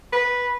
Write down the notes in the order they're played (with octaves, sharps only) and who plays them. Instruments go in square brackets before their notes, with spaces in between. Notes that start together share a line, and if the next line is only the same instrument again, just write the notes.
[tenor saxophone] B4